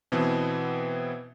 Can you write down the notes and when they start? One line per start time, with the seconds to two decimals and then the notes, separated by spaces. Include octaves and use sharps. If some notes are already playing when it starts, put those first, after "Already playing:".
0.12 B2 E3 B3 C4